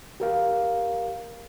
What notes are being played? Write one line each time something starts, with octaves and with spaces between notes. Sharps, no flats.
G4 A#4 F5